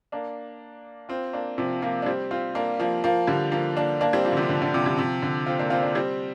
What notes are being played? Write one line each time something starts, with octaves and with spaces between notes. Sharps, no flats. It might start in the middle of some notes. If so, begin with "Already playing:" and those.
A#3 D4
C4 F4
A#3 D4
C3 F3
F3 A#3
D4
G3 C4
C4 F4
A#3 D4
F3 A#3
F3 A#3
D3 G3
F3 A#3
A#3 D4
A#3 D4
G3 C4
F3 A#3
D3
C3 F3
D3
D3
C3 F3
D3 G3
C3 F3
D3
C4 F4
A#3 D4
C4 F4
A#3 D4
G3 C4